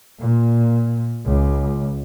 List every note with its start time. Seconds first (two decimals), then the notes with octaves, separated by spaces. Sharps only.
0.20 A#2
1.25 C#2